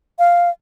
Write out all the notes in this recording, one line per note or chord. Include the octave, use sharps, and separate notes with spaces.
F5